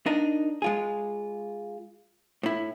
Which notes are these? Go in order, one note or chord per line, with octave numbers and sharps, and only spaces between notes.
D4 D#4 A#4
G#3 F4 G#4
A2 E4